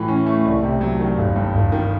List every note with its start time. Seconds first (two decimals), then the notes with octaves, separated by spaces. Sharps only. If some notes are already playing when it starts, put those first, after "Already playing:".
Already playing: A2 E3
0.08 C#4
0.26 A3
0.45 C2
0.63 C3
0.81 F#3
1.00 D#3
1.17 G1
1.36 G2
1.55 G1
1.72 D#3